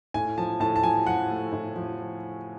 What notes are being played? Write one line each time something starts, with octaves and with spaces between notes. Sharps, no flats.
A2 G#5
F3 A5
A2 A5
A5
F3 G#5
F3 F#5
A3
A2
F3